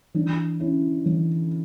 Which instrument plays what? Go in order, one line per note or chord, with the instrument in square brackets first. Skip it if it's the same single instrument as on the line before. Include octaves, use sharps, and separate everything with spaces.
[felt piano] E3 D4
C#4 E4
E3